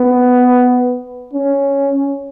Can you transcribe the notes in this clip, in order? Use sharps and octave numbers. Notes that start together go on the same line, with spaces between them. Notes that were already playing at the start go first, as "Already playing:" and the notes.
Already playing: B3
C#4